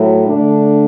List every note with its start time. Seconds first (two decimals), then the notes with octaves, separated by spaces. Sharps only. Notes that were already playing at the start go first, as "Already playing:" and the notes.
Already playing: A2 F#3 A3
0.26 D3 A3 D4